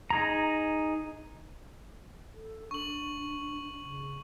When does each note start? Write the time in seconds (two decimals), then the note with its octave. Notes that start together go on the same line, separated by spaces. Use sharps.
0.10 D#4 G#4 A#5
2.34 A4
2.71 D4 C#6 F#7
3.80 C#3